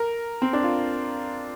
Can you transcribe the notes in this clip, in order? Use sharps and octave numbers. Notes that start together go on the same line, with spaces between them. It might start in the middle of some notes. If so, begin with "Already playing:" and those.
Already playing: A#4
C4
D4
F4